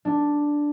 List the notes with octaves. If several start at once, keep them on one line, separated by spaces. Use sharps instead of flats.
D4